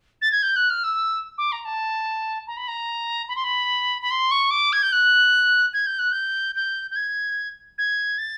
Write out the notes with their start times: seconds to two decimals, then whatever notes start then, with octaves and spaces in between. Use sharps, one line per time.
0.21 A6
0.32 G#6
0.42 G6
0.56 F#6
0.70 F6
0.84 E6
1.38 D6
1.52 A#5
1.65 A5
2.47 A#5
2.57 B5
2.68 A#5
3.28 B5
3.36 C6
3.44 B5
4.02 B5
4.11 C6
4.31 C#6
4.50 D6
4.72 G#6
4.82 G6
4.92 F#6
5.73 G#6
5.86 G6
5.99 F#6
6.12 G6
6.55 G6
6.91 G6
6.96 G#6
7.78 G#6
8.18 A6